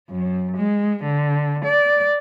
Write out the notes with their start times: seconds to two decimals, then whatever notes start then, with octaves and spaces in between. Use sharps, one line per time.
0.10 F#2
0.56 G#3
1.03 D3
1.64 D5